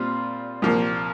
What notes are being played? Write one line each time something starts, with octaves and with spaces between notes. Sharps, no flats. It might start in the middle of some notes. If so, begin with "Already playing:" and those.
Already playing: A#2 G3 C4 F4
C2 A#2 F3 A#3